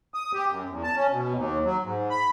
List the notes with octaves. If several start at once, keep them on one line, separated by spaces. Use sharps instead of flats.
D#6
G4
F#2
E2
A5
C#4
B2
D#2
F#3
G#2
B5